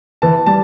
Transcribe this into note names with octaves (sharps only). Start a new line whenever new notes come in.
E3 A5
G3 A5